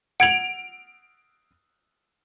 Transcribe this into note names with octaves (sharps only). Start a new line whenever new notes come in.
F#5 G#6 D7 F7 F#7